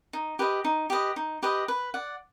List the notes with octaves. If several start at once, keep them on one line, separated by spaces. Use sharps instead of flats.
D#4
G4 B4 D#5
D#4
G4 B4 D#5
D#4
G4 B4 D#5
B4
D5 F#5